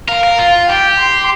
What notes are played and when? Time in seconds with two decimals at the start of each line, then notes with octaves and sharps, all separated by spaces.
0.09 A#4 F5
0.24 A#4
0.39 F4
0.69 G4 G5
0.99 C6